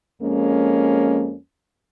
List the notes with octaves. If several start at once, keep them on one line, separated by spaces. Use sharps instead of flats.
F2 G#3 A#3 C#4